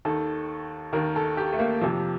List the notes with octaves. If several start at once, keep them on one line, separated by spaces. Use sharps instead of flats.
D#2 D#3 A4
D#2 D#3 A#4
A4
G4
A3
A#3
F2 C3 F3